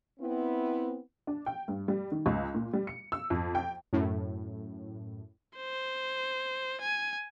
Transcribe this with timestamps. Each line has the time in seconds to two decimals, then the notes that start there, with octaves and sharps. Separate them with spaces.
0.20 B3 C4 E4
1.27 D4
1.46 G5
1.68 G2
1.88 G3
2.12 D#3
2.26 C#2
2.55 A#2
2.73 G3
2.87 C#7
3.12 E6
3.30 F2
3.55 G5
3.93 F#2 A2
5.57 C5
6.81 G#5